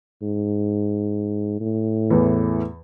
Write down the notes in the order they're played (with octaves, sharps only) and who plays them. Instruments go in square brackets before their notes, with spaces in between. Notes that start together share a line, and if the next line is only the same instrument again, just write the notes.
[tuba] G#2
A2
[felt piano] E2 E3